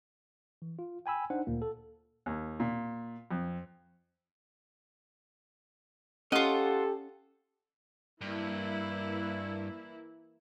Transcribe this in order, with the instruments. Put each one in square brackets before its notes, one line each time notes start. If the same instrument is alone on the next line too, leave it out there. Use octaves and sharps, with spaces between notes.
[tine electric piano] E3
F4
G5 G#5 B5 E6
D4 D#4 C5 F#5
D2 A#2 A#3
A4
[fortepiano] D#2
A#2
F2
[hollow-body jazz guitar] C#4 D#5 [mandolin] F4 F#5 [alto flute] G4 [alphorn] A4
[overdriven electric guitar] G2 [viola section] E3 A#3 E4